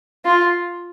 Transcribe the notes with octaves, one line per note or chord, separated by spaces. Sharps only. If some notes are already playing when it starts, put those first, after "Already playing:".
F4